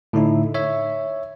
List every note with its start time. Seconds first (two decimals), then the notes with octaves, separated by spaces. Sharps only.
0.13 A2 D3 D#4 E4
0.54 C#5 E5